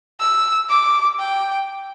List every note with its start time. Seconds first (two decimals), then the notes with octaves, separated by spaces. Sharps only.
0.20 E6
0.69 D6
1.19 G5